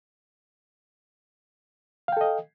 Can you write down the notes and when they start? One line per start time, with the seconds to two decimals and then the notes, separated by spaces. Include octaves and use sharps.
2.08 F5
2.12 G5
2.17 A4
2.21 D#5